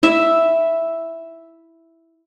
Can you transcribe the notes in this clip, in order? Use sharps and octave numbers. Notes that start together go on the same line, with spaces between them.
E4 E5